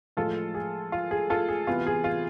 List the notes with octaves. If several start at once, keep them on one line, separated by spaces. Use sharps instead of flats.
A2 F3 G#3 F4 A4
G#4
F4
G#4
F4 A4
G#4
C3 E3 B3 F4
G#4
F4